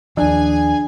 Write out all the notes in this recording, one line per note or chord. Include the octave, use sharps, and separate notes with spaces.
D#2 F3 D4 G#4 G#5